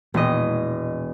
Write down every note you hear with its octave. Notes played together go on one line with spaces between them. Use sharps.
E1 A#2 D#5